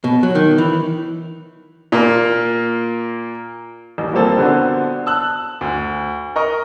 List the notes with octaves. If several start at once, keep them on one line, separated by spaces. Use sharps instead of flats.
B2
F#3
D#3
E3
A#2 A#3
A1 D#2
A#2 F3 G3 A#3 C4 A4
D3 B3 C4 D4 F#4
A5 E6 F#6
D2
A#4 D#5 C#6